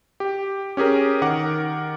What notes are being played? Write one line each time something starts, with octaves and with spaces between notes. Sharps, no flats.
G4
C#4 G4 G#4 A#4
D#3 A#4 F#5 D6